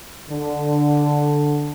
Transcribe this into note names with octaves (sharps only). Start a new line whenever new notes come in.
D3